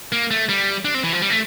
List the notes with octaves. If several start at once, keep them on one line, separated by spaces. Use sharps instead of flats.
A#3
A3
G3
D4
C4
E3
F3
G3
A3